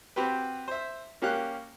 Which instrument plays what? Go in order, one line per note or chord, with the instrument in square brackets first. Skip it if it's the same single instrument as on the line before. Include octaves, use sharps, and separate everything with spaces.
[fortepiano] C4 F#4 G4 B4
C5 E5
A#3 C#4 G4 F5 F#6